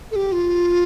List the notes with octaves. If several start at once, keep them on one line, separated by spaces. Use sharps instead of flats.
A4
G4
F4